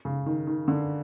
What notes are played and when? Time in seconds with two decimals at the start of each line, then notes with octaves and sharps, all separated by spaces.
0.05 C#3
0.26 D#3
0.47 D#3
0.68 D3